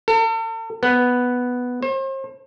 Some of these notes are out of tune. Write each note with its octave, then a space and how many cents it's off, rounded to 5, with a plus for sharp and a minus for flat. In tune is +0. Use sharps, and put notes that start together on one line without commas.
A4 +45
B3 +0
C5 +40